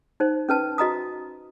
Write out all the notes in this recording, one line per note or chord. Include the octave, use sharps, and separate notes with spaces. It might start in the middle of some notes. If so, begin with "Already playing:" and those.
D#4 C5
C#4 B4 A5
F#4 D#5 A#5 D#6